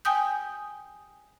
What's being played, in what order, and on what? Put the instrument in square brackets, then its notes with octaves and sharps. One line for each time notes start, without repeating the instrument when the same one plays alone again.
[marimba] G5 G#5 D#6 G6